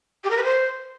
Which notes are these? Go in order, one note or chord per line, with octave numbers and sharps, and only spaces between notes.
G4
A#4
B4
C5